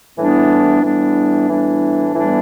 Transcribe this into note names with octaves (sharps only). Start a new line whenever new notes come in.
A2 E3 G3 B3 D4
A2 E3 G3 B3 D4
A2 E3 G3 B3 D4
A2 E3 G3 B3 D4